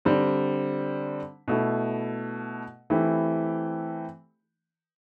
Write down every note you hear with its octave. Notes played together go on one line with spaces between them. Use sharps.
D3 G3 C4
B2 A3 E4
E3 A3 C4 E4 G4